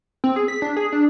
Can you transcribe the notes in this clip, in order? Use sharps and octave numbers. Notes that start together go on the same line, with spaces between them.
C4
G#4
B6
D4
G#4
D4